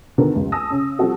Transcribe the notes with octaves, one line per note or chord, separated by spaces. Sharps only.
D3 D#3 B3 F4 A4 A#4
F1 C#2
G#5 A5 D#6 E6 A#6
C#3 C#4
F3 G3 C4 F#4 A4